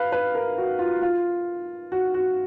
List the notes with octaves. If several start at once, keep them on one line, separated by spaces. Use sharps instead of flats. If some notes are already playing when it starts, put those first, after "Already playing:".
Already playing: B4 F5
B4
A#4
F#4
F4
F4
F#4
F#4